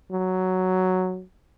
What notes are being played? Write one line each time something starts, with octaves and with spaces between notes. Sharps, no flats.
F#3